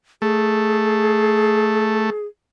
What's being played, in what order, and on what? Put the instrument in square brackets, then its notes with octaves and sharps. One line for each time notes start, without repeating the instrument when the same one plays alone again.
[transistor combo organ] A3 [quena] G#4